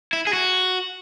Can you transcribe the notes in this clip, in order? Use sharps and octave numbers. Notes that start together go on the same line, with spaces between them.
E4
G#4
F#4